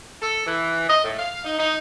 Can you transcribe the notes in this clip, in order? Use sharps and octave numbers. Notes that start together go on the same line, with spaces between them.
A4
E3
D#5
A2
F5
D#4
D#4